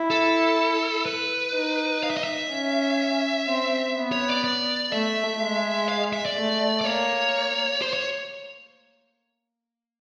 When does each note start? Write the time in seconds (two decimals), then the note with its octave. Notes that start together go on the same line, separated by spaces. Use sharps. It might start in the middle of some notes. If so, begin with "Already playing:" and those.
Already playing: E4
0.10 A4
1.06 B4
1.54 D#4
2.03 F5
2.10 E5
2.17 D#5
2.24 E5
2.51 C#4
3.48 C4
3.96 B3
4.12 C#5
4.28 D5
4.44 D5
4.92 A3 E5
5.41 G#3
5.89 F5
6.13 E5
6.25 D5
6.36 A3
6.81 D5
6.85 A#3 C#5
7.82 C5
7.93 C#5